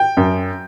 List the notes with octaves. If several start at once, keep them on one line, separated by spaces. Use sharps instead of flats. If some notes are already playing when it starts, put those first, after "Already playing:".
Already playing: G5
F#2